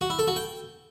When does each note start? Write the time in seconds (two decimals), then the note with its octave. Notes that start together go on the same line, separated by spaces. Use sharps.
0.01 F#4
0.10 E4
0.19 A4
0.27 F#4
0.36 G5